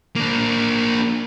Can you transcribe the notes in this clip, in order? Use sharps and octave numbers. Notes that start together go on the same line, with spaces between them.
A#3 D4